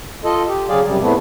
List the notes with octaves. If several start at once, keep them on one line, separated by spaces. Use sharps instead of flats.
F4 A4 D#5
G4
C#3 F#3 G#4 D5 F5
F#2 C3 G3
E2 A2 A3 B3 C4